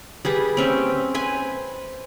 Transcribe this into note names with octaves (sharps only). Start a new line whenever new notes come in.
G3 G#4 B4
C4 C#4 E5 G5
B4 C5 G#5